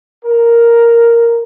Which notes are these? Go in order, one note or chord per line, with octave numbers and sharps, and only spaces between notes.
A#4